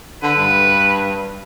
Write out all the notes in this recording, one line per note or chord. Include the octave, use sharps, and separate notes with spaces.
D3 B4
G2